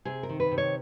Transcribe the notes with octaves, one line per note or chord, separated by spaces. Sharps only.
C3 G#4
A#4
D#3
B4
C3
C#5